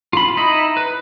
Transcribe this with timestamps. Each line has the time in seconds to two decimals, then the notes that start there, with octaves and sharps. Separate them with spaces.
0.13 F4 B5
0.37 D#4 E4 B5
0.77 B4